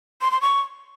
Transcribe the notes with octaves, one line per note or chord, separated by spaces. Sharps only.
C6
C6
C#6